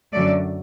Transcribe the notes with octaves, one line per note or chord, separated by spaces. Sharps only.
F#2 D3 F#3 A3 D5